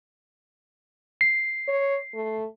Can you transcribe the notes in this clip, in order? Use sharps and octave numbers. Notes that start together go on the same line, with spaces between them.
C7
C#5
A3